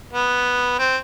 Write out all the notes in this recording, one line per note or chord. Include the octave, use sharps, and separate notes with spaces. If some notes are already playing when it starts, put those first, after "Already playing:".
B3
C4